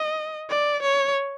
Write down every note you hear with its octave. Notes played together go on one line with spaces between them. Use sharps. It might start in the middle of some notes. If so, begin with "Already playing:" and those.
Already playing: D#5
D5
C#5